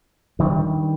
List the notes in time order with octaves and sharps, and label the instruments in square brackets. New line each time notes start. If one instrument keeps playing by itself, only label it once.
[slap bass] G2 D#3 G3